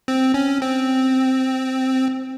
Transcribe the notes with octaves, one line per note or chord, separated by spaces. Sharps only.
C4
C#4
C4